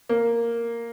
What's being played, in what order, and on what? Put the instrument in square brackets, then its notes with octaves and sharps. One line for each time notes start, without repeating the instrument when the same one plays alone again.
[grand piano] A#3